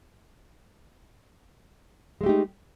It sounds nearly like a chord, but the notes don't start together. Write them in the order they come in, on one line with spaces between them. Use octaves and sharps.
G#3 A3 G4 D#4